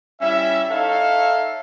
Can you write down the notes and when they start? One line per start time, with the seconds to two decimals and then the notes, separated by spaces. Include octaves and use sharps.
0.21 G3 C#4 E4 E5
0.70 D#4 A4 C#5 E5 F5